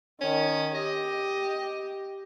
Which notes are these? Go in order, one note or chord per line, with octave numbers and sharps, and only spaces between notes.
D#3 C#4
G4 D#5